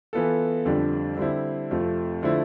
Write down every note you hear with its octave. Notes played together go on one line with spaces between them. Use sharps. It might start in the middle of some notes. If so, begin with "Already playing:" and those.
E3 B3 F4 A4
F2 D3 G3 D4
D3 G3 C4 E4
F2 C3 F3 A3
D3 F3 A3 E4